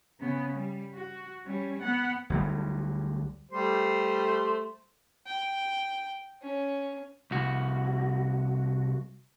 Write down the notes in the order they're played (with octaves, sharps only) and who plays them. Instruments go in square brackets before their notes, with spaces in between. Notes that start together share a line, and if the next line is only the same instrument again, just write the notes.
[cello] C#3 B3
G3
F#4
G3 C#4
B3 F#5
[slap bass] D2 F#3 G3
[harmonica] G3 A3 C5
[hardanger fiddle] G5
C#4
[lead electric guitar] C2 F#4